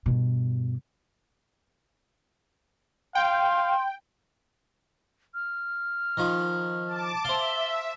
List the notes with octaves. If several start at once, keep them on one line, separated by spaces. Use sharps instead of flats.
G2 B2
F5 G5 C6
F6
D#3 F3
A5 D6
C5 E5 F5 G7